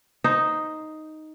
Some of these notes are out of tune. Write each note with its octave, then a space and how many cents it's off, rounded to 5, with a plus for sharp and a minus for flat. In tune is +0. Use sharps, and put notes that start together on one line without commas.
D#4 +0 C5 +0